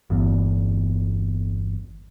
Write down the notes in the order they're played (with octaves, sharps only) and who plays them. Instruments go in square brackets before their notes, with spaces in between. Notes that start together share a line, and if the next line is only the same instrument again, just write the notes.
[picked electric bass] G1 E2